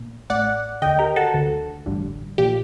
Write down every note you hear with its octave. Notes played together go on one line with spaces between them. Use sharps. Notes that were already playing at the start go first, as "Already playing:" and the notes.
Already playing: A#1 A#2
A1 A2 D5 F#5
D#2 D3 D#5 G5
G4 A#4
F#4 A4
D2 D3
A1 G2 D3
A#1 A#2 G4